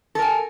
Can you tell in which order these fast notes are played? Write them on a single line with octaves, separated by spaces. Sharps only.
A4 A#4 G#5